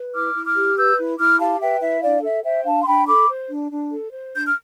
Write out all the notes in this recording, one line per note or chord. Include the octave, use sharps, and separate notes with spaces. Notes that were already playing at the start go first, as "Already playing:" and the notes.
Already playing: B4
E4 D6 F6
E4
D6 F6
G4
B4 E6 G6
E4
E4 D6 F6
G4 F5 A5
B4 E5 G5
E4 E5
D4 D5 F5
A4 E5
C5 E5 G5
D4 F5 A5
C6
D4 G5 B5
A4 B5 D6
C5
D4
D4
A4
C5
D4 G6
F6